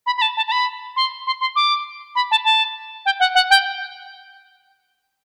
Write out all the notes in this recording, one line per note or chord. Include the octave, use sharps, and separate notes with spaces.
B5
B5
A5
A5
A5
B5
C6
C6
C6
D6
B5
A5
A5
G5
F#5
F#5
G5